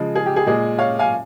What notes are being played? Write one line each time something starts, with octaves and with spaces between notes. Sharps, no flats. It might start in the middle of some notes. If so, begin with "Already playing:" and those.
Already playing: C#3 F3 G#3
G#4
G4
G#4
A#2 G#3 G#4
C#5 F5
F5 G#5